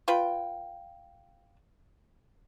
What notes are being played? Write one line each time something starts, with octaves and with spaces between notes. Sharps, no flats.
F4 B4 G5